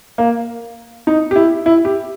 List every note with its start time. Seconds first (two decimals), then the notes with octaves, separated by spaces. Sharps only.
0.18 A#3
1.07 D#4
1.31 G4
1.36 E4
1.66 E4
1.85 G4